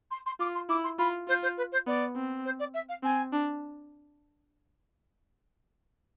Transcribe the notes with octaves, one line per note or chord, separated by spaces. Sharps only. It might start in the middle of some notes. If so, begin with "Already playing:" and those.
C6
C6
F4 D6
C6
E4 D6
C6
F4 B5
F4 C5
C5
B4
C5
B3 D5
C4
C5
D5
E5
F5
C4 G#5
D4